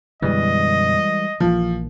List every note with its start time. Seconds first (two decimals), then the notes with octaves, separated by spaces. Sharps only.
0.22 F#2 B2 D3 E3 G3 G#3 D#5
1.40 A#1 E3 F3 A#3